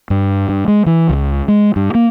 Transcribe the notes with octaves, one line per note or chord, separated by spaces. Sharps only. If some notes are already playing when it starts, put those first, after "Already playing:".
G2
G2
G#3
E3
C#2
G#3
G2
A#3